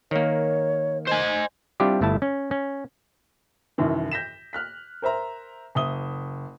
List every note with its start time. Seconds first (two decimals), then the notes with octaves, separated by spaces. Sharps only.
0.11 D#3 A#3 C#5
1.08 C5 D#5 G#5
1.80 G3 C4 D4 E4 F4 G4
2.01 G1 A3 E4 A5
2.22 C#4
2.51 C#4
3.78 C2 F#2 D#3 E3
4.11 G6 A#6 B6 E7
4.53 F6 F#6 B6
5.02 A#4 C5 E5 A#5
5.75 F#1 E5 D#6 G7